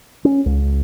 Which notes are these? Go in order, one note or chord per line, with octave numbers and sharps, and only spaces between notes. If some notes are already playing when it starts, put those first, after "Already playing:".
C#4
C#2